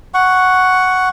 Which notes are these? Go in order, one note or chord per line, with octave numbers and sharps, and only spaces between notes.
F#5 C#6